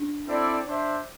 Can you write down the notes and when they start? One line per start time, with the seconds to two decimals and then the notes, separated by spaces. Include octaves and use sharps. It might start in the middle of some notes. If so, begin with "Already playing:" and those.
Already playing: D4
0.25 C4 E4 A4 D5
0.65 D4 C5 E5